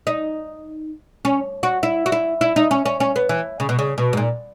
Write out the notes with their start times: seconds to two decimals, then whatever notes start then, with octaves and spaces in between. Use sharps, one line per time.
0.07 D#4
1.25 C#4
1.63 F#4
1.83 E4
2.06 F#4
2.12 E4
2.41 E4
2.56 D#4
2.71 C#4
2.86 C#4
3.00 C#4
3.16 B3
3.29 E3
3.60 C#3
3.69 B2
3.79 C#3
3.98 B2
4.13 G#2
4.17 A#2